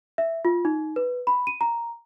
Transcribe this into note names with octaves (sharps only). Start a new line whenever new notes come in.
E5
F4
D#4
B4
B5
D#7
A#5